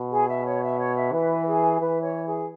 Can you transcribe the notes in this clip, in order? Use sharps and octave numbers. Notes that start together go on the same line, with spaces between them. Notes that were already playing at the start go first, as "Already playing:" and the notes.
Already playing: B2
G#4
E5
C#5
E5
C#5
E5
E3 B4
G#4
E3 B4
C#5
G#4